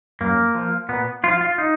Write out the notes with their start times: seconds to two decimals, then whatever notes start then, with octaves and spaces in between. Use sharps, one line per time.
0.21 F#2 A#3
0.55 F3
0.89 A#2 B3
1.23 F3 F4
1.41 F4
1.58 D#4